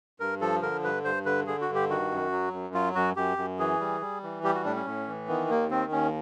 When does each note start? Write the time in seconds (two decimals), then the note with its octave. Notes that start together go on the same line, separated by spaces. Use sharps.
0.20 G2 A#4
0.41 F3 A4
0.62 D3 A#4
0.83 G2 B4
1.04 G2 C5
1.25 D3 B4
1.47 D3 G#4
1.61 F#4
1.69 G2
1.75 G4
1.89 D#3 F#4
2.11 F#2
2.32 F#3
2.53 F#2
2.74 F#3 F4
2.95 F#2 F#4
3.16 F#2 G4
3.37 F#2
3.59 E3 G#4
3.80 G3
4.01 G3
4.23 E3
4.43 G3 G4
4.55 F#4
4.65 A2 D4
4.75 C#4
4.86 A2
5.08 E3
5.28 D#3 B3
5.50 D#2 A#3
5.71 D#3 C4
5.92 D#2 C#4